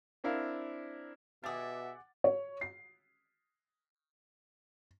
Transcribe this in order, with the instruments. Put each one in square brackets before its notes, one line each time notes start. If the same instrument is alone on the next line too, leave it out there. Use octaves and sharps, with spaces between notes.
[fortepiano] C4 D4 E4 A#4 F5
[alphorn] B2 [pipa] G3 G#4 [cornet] E5 [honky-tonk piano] F#5 D6 A6
[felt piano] C#5
C7